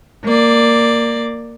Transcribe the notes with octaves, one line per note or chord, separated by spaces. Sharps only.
A#3 D5